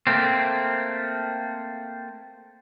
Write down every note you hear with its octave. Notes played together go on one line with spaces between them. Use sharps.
A3 A#3 C4